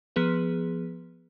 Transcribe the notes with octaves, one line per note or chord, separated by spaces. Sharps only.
F3 B3 G#4 B4